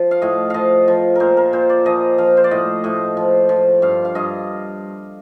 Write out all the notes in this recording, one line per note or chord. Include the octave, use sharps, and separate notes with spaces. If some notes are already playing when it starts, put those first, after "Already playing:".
Already playing: F3
F5
A2 D#5
F3 D#5 F5
F3
A#2 A#4 C5
A#4
A#2 C5
D5
F3 D#5
F3 F5
C5
D5
A2 D#5
A2 D#5
F3
F3
G2 F5
F5
G2 D#5